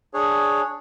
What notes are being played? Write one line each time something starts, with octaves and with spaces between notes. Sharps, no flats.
D4 G#4 C#5